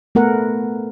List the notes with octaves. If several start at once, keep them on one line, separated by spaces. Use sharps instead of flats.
A3 B3 A#4 F#5